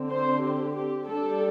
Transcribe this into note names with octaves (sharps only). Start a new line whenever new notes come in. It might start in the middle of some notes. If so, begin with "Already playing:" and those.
Already playing: D3 C4
C5
G4
G4
G3 D4 A4